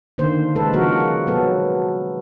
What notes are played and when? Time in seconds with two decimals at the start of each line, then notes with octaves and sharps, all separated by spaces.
0.18 D3 D#3 A#3 C5
0.55 C#3 G#3 A4 B4
0.73 C#3 F3 A#3 F#4 A#4
1.27 F#3 B3 A4